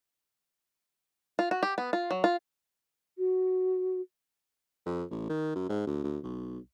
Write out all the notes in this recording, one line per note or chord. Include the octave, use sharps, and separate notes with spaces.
F4
F#4
G4
B3
F4
F#3
F4
F#4
F2
A1
D#3
F#2
G#2
D2
D2
B1